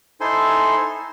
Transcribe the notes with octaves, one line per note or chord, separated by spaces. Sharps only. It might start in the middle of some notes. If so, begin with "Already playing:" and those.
D#4 E4 A4 C5 G#5 C6